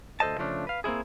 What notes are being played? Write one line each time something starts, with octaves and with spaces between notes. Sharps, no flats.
D2 A4 C5 D#5 A5
C#3 F3 A3 C#4 D4
B4 F5
A#3 C4 D4 E4 G#4